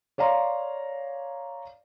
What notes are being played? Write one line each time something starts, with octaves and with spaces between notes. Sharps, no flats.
C#5 D5 F5 A#5 C6